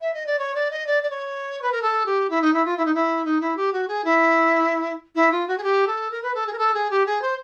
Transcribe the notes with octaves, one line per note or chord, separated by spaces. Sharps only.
E5
D#5
D5
C#5
D5
D#5
D5
D5
C#5
B4
A#4
A4
G4
E4
D#4
E4
F4
E4
D#4
E4
D#4
E4
G4
F#4
G#4
E4
E4
F4
F#4
G#4
G4
A4
A#4
B4
A4
G#4
A#4
A4
G#4
G4
G#4
C5